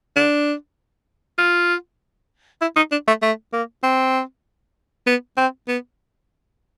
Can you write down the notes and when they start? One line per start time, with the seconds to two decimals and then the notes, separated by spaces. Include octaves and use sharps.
0.16 D4
1.38 F4
2.61 E4
2.76 D#4
2.92 D4
3.08 A3
3.22 A3
3.53 A#3
3.83 C4
5.06 B3
5.37 C4
5.68 B3